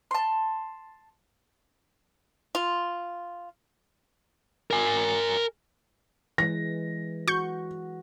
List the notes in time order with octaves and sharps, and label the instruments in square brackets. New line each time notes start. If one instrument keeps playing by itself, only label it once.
[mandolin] A5 C6
[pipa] F4
[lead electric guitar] A#4 G#5
[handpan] E3 G#3 [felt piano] A#6
[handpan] F#4 [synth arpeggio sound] C#6 G6